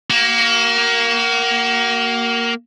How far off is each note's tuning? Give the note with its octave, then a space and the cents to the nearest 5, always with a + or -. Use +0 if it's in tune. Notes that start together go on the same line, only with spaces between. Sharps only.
A#3 +0 F#4 +40